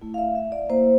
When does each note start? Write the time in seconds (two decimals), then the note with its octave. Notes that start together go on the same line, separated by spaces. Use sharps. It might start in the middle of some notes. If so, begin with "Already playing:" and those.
0.01 A3 E4
0.14 F5
0.18 E5
0.35 E5
0.52 D5
0.70 A#3 E4 C5